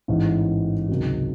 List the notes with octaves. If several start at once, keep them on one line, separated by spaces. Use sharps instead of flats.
A1 G#2 E3
C#2 C3 D#3 F#3